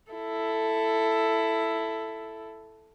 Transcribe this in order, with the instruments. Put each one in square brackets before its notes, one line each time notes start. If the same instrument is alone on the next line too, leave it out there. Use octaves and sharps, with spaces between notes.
[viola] E4 A4